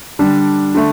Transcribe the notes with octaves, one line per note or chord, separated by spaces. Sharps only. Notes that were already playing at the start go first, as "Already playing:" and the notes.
D3 G3 D4
D3 A3